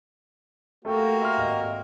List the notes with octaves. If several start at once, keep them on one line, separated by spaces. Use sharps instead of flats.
A3 A#3 F#4 G4 A4 G5
E5 C6 F6
G#1 D#5